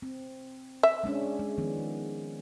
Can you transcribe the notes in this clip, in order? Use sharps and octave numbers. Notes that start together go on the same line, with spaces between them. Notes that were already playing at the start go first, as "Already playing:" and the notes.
C4
E5
G#3 C#4 D4
G#3
D#3 F3 B3